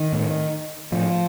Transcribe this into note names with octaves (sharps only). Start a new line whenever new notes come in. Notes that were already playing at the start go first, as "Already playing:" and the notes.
Already playing: D#3
A2
A2 F3